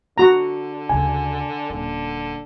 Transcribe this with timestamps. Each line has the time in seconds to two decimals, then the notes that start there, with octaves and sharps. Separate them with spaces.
0.18 D3 F#4 A#5
0.89 D2 C#3 G#5
1.70 D#1 D3 C#4